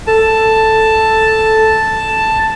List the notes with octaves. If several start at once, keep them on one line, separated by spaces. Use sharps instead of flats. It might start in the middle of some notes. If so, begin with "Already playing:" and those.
A4 A5